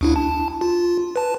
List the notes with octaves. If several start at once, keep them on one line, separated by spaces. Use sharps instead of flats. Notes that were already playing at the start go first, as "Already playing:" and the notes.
D2 D4 E4
A5
F4
B4 A5